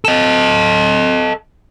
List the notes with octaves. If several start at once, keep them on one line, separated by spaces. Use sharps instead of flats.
A4 D#5